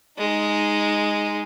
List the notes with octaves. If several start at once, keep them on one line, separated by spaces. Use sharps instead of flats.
G#3 D#4